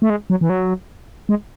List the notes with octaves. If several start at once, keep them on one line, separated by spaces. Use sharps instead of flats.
A3
G#3
F#3
E3
F#3
G#3